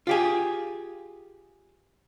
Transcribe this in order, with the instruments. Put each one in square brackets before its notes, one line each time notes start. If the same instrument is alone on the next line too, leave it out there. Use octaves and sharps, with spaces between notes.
[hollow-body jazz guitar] F4 G4 G#4